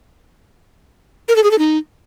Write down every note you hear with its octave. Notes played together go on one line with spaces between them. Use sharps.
A#4
A4
G#4
A4
D#4